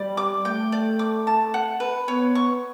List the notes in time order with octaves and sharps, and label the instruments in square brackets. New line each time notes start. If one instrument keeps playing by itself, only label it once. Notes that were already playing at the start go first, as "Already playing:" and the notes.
Already playing: [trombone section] G3 [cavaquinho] D5
[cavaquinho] D6
[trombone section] A3 [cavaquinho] G5
[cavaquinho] D5
D6
A5
F#5
B4
[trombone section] B3 [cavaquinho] C#5
[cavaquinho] C#6